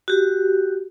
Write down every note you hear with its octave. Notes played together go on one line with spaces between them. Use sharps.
F#4 G4